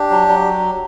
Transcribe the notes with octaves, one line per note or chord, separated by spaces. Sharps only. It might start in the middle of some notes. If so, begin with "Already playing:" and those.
Already playing: D4 G4
F#3
F#3